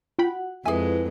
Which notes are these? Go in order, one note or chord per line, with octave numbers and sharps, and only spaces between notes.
F4 F#4 F#5 G5 B5
F2 G#3 E4 G#4 B4 E5 G#5